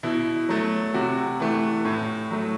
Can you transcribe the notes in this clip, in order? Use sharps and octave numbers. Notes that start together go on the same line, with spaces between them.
B2 E4
F#3 A3
C3 F#4
E3 A3
A2
F#3 A3